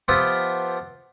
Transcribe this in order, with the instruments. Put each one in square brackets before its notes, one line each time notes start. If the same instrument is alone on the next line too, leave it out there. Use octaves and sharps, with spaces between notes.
[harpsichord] F3 B3 F4 G4 E5 D#6